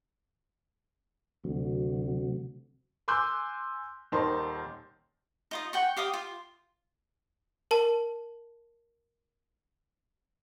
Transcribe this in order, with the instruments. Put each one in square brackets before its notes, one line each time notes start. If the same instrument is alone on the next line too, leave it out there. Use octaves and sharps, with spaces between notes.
[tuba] D2 [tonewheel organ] C3 F#3
[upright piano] G#5 C6 D6 E6 F#6 G6
D#1 D#3 D#4 C5 A5 C6
[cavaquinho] D#4 F4 D#5
F#5 G5 C#6
G4 F5 D6 D#6
F4
[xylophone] A#4 A5